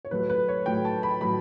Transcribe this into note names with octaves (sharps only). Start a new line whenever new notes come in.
C#5
A2 F#3 A3 B4
B4
C#5
A2 F#3 A3 G5
A5
B5
A2 F#3 A3 B5